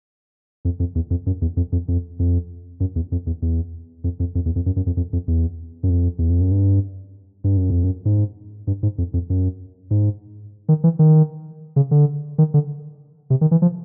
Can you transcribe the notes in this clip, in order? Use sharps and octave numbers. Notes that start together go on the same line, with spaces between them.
F2
F2
E2
F2
F#2
E2
F2
F2
F2
F2
F#2
E2
F2
E2
E2
F2
F2
F2
E2
F2
F#2
F#2
F2
F2
F2
E2
F#2
F2
E2
F2
F#2
G2
G2
F#2
F2
F#2
G#2
G2
G#2
F2
F2
F#2
G#2
D#3
E3
D#3
C#3
D3
D#3
D3
C3
D#3
E3
F3